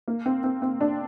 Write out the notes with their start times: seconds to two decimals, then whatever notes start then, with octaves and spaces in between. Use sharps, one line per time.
0.08 A#3
0.26 C4
0.44 C4
0.62 C4
0.81 D4